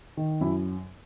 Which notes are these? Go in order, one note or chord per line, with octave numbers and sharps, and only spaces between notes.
D#3
F#2 E4